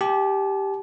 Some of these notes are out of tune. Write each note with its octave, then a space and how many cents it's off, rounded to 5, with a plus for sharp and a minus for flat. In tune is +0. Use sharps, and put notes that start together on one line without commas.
G4 +0 A5 -40